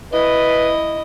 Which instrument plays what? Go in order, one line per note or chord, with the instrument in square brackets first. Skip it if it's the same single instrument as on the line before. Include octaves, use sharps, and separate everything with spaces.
[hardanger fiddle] E4 D#5 [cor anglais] B4